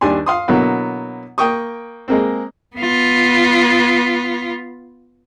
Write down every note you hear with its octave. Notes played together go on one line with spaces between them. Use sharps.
D#2 G3 D4 G#5 C6
F5 C6 D#6
B2 D3 F#3 A#3 B3 E4
A#3 G5 C#6 D#6
G#3 A#3 C4
B3 F4